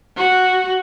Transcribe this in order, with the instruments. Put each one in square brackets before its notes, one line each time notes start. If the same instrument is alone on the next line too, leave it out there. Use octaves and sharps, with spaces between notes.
[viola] F#4